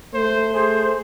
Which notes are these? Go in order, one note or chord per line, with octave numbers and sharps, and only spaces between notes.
A3 C5
G#4 C5